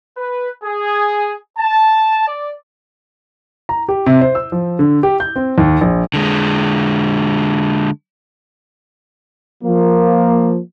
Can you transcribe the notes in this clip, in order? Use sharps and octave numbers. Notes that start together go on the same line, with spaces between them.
B4
G#4
A5
D5
A#5
G4
C3
C5
E6
F3
D3
G4
G6
C4
D#2
A#1
D3 G#3
F3 A#3